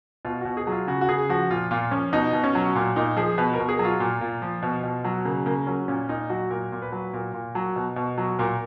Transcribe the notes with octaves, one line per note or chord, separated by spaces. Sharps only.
B2 F4
B2 F#4
G#4
F#3
F4
C#3 F#4
F#4
C#3 G#4
F3 F#4
A#2 F4
A#2 F4
F3 C#4
B2 D#4
B2
C#4
F#3
A#2
A#2 D#4
F3 G#4
B2 B4
A#4
B2
G#4
F#3
F4
A#2
A#2
F3
B2
B2
F#3
C#3 A#3
C#3 A#3
F#3 C#4
A#2 C#4
A#2 D#4
F#3 F#4
A#2 A#4
A#2
B4
F#3
A#2 A#4
A#2
F#3
B2
B2
F#3
A#2 A#4